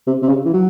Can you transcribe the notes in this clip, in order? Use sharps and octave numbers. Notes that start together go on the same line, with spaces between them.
C3
C3
C#3
E3
F#3